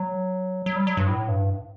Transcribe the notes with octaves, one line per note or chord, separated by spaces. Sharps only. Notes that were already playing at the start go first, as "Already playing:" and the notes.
Already playing: F#3
F#3
G3
F#3
G2
A2
G2